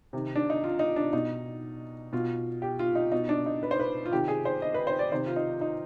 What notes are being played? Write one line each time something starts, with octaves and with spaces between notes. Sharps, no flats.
C3 D#3
D4
D#4
F4
D#4
D4
B2 D#4
B2 F4
G4
F4
D#4
B2 D#4
D4
D#4
B4
C5
B4
F4
C3 D#3 G4
G#4
C5
D#5
B4
C5
D5
C3 D#3 C5
F4
D#4
D#4